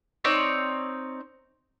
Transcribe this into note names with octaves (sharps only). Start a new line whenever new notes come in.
C4 D#4 C#5 D5